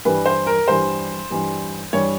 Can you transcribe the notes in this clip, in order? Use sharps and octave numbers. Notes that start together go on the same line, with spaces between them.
G2 E3 G3 B4
C5
A#4
G2 E3 G3 C5
G2 E3 G3
G2 E3 G3 C#5